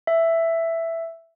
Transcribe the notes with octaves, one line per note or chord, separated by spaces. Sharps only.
E5